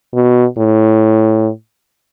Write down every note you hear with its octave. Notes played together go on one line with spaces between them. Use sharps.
B2
A2